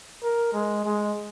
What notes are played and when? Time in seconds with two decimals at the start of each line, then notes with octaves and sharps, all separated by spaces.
0.22 A#4
0.53 G#3
0.85 G#3